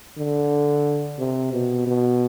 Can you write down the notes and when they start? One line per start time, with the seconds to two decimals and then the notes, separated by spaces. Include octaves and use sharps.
0.18 D3
1.19 C3
1.52 B2
1.87 B2